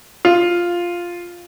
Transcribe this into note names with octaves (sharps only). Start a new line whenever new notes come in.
F4